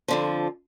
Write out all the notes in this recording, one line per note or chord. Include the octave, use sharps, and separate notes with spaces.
F2 D3 F3